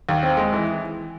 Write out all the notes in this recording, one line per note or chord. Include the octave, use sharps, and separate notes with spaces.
D#2
C4
G#3
E3